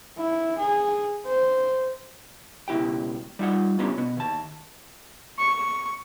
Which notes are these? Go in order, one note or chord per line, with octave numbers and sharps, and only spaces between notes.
E4
G#4
C5
C#2 B2 E4 G4 G5
G3 D#4 F4 F#5
B3 C#4 D4 F4 G4 C#5
B2 B3
D#2 A5
C#6